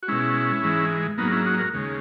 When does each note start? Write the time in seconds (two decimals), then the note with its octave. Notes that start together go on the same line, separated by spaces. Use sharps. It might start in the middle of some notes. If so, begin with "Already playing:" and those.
0.03 F#4
0.08 B2 G#3 C#4 E4
0.63 G#2 E3 G#3
1.18 G#2 F#3 A#3 B3 D#4
1.32 C#4 E4
1.46 D#4 F#4
1.59 F#4 A#4
1.74 D#2 C#3 G#3